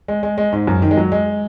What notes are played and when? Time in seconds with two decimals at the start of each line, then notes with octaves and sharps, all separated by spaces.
0.08 G#3
0.23 G#3
0.38 G#3
0.52 G#2
0.67 F#2
0.82 D#3
0.91 G#3
0.97 F#3
1.12 G#3